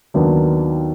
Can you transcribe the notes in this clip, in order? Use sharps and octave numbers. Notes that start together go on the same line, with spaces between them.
D#2 D#3 F#3 B3 D4